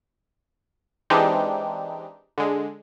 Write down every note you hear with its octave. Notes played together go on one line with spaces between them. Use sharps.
E3 G#3 C4 D4 D#4 G4
D3 G#3